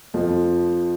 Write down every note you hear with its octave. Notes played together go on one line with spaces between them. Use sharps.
F2 F3